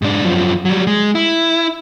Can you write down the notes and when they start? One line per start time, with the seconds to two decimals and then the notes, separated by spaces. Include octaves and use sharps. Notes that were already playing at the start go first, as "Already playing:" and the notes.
0.02 G#2 D4
0.24 F#2 F3
0.65 F#3 G3
0.87 G#3
1.15 E4